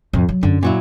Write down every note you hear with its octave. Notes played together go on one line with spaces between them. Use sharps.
F2 A2
F#3
F#2 D3 C#4
A#2 F#3 E4